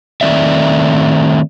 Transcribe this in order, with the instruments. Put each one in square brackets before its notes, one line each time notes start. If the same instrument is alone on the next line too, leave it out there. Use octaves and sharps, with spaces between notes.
[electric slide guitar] D#3 A3 C4 D5 E5